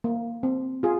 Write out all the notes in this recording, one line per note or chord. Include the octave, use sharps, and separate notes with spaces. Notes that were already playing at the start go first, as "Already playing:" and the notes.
A#3
C4
F4 G#4